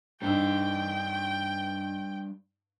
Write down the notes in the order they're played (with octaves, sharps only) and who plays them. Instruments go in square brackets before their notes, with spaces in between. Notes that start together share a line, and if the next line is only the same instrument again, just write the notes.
[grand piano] G2 D#4 E6 [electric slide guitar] G3 D4 C5 [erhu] G5